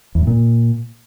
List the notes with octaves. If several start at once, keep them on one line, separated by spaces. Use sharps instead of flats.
E2
G2
A#2